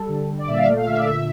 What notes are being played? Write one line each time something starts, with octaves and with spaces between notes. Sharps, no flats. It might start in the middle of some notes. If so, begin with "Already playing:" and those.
Already playing: G3 A4
D3
G3
D5
A#2 E5
F5
E5
A3 D5
F5
D3 E5
D5
A#2 E5